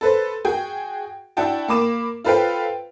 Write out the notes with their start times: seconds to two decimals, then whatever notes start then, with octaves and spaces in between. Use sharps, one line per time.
0.01 A4 B4 C5
0.45 F#4 G#4 G5
1.37 D4 E4 F#4 F#5 G5 A5
1.68 A#3 B5 D6 E7
2.24 F4 A4 B4 C5 F5 G5